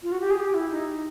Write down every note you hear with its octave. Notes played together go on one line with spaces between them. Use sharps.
F4
F#4
G4
G#4
G4
E4
D#4